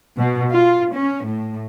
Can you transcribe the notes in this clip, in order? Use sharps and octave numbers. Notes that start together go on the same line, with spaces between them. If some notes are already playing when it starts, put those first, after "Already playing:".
B2
F4
C#4
A2